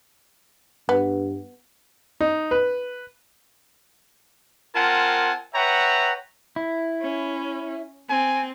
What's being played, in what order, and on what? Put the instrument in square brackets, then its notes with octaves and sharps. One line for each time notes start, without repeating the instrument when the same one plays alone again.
[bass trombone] G2 [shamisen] B3
[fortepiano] D#4
B4
[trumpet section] C4 F4 A#4 F#5 G#5 A5
B4 C#5 E5 F#5 G5 A#5
[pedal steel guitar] E4
[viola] C#4
[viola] C4 [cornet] G#5